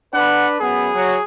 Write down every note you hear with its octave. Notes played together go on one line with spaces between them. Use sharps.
D4 B4 F#5
F#2 B3 G#4
F#3